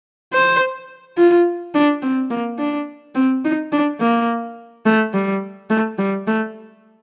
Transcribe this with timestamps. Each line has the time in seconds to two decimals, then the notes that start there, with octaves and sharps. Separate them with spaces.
0.32 C5
1.17 F4
1.74 D4
2.02 C4
2.30 A#3
2.58 D4
3.15 C4
3.44 D#4
3.72 D4
4.00 A#3
4.86 A3
5.13 G3
5.70 A3
5.98 G3
6.27 A3